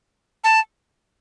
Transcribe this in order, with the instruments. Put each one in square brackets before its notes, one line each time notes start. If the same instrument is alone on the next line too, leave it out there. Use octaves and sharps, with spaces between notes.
[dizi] A5